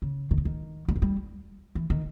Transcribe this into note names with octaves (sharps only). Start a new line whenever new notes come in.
C#3
D#3
C#3
D#3
G3
E3
G3
E3
D#3